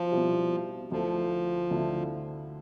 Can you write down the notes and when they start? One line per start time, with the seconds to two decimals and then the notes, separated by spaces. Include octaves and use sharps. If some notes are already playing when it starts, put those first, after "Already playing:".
Already playing: B2 F3
0.12 B2 G3 C4 E4
0.92 D2 D3 F3 A3 E4
1.71 D2 D3 A3 E4